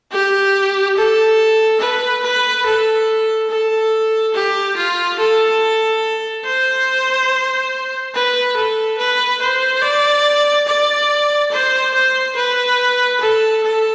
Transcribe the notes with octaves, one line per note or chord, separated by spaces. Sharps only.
G4
A4
B4
B4
A4
A4
G4
F4
A4
C5
B4
A4
B4
C5
D5
D5
C5
C5
B4
A4
A4